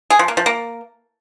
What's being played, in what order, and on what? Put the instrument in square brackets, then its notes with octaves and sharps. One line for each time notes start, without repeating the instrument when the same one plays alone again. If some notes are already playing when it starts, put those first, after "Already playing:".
[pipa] G#4
F3
A#3
F3
A#3